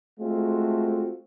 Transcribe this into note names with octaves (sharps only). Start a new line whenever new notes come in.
G#3 A3 C4 F4 F#4